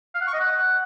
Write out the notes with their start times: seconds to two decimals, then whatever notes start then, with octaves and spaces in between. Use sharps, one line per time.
0.14 F5
0.21 F#5
0.27 C#6
0.34 D#5
0.40 F#5